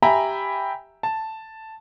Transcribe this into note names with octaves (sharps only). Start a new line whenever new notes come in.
G4 E5 G5 G#5 A#5 B5
A5